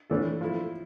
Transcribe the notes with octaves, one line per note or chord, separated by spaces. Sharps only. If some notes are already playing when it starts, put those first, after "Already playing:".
A2 E3 A3 D4 A4
F3 A3 E4